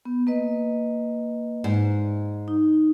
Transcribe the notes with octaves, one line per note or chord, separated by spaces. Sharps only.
B3
A#3 B4 D#5
G#2
D#4